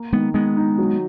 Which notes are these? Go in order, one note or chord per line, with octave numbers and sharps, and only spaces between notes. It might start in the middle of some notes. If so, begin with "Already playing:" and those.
Already playing: A#3
D#3 G#3 B3
D#3 G#3 B3
D#4
F#3